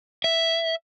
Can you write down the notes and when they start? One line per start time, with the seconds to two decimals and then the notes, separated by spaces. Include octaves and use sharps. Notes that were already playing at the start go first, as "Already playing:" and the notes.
0.24 E5